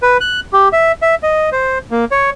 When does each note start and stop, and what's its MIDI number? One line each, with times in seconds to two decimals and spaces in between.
0.02 0.17 71
0.21 0.40 90
0.53 0.69 67
0.73 0.92 76
1.02 1.15 76
1.23 1.50 75
1.52 1.78 72
1.91 2.05 58
2.12 2.30 73